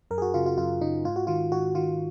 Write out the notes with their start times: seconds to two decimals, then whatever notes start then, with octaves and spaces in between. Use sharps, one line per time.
0.11 F#2 A#4
0.18 G#4
0.22 F#4
0.34 C#3 F4
0.46 F4
0.58 F#2 F4
0.81 C#3 D#4
1.05 G#2 F4
1.16 F#4
1.27 D#3 F4
1.52 G#2 F#4
1.75 D#3 F4